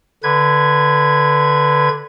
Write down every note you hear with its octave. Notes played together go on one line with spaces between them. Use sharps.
D3 B4 G#6